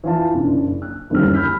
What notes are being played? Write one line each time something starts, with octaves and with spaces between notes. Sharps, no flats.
E3 F4 A5
F#1 C#3 D4
F#6
F#1 D2 D#3 G3 C#4 F6
B5 F6 G6 B6